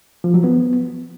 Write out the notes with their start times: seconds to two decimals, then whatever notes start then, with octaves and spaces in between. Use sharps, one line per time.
0.24 F3
0.34 F#3
0.44 B3